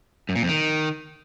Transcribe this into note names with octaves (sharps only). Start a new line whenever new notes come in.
F#2
A#2
F2
D#3